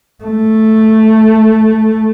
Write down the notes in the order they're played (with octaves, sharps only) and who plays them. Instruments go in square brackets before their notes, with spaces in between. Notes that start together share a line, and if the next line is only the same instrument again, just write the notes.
[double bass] A3